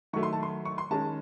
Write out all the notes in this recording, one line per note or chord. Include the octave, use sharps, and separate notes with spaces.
D#3 F#3 A3 C#6
C6
A5
C6
C#6
C6
D#3 G#3 C#4 A5